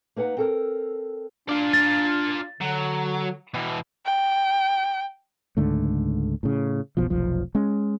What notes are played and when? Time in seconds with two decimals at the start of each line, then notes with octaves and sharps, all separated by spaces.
0.16 A#3 D#4 B4 F#5 A#5
0.37 C4 A4 A#4
1.49 D4 F4 D5
1.73 A6
2.61 D3 F#3
3.54 B2 E3
4.06 G5
5.57 C#2 G#2 D3 A3
6.43 A2 C#3
6.97 F#1 B1 B2 F3
7.10 F1 B1 F3
7.55 G#3 C#4